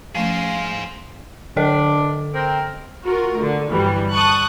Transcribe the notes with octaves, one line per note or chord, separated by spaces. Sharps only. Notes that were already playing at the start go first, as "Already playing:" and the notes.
F3 A3 C#4 G#4 C5 F5
D3 D4 A4 D#5
C4 A#4
F4 F#4 A#4
D3 A3
G1 E3 F#3 G3
A5 C#6 D#6 F#6